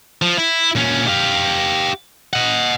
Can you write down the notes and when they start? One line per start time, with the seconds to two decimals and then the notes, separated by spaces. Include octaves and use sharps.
0.22 F3
0.38 E4
0.75 A#2 C#4
1.08 G4 F5
2.33 D#5 F#5